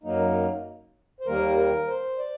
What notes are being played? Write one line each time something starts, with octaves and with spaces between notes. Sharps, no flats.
F#2 F#3 A#3 D#4
C5
D#2 D#3 G3 A#3 A#4
A#4
C5
D5